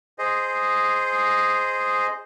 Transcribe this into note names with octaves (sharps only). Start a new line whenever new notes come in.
G#4 C5 D#5